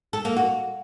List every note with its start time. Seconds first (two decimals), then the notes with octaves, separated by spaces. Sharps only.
0.13 A4
0.25 A#3
0.36 F#4